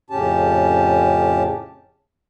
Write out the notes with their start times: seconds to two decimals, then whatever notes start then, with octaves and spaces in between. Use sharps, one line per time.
0.10 F2 A2 C#3 C#4 G4 A5